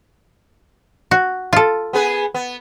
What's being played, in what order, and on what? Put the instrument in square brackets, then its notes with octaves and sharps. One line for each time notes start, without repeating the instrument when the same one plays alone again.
[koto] F#4
F4 A4
[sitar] B3 G#4 B4
B3